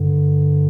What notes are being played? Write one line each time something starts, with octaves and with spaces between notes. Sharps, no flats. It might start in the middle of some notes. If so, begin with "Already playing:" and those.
Already playing: G2 D3